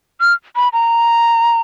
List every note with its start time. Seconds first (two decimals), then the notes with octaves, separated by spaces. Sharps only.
0.21 F6
0.56 B5
0.73 A#5